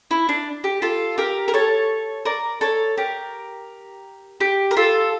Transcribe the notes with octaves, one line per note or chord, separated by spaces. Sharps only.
E4
D4
G4
F4 A4
G4 A#4
A#4
A4 C#5
A#4 D5
A4 C#5
G4 A#4
G4
A#4
F4 A4